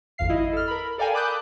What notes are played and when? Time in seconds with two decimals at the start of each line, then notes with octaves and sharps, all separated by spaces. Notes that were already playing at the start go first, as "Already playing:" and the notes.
0.18 G#1 F2 F5 C7
0.29 E4 D#5
0.53 A4 F6
0.68 A#4 B5
0.98 A4 A#4 D5 F5 G5 G#5
1.13 A5 B5 D6 D#6 F#6 G6